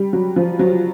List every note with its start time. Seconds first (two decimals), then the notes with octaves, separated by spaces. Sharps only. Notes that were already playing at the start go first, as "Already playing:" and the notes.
Already playing: G3
0.13 F#3
0.36 F3
0.59 F#3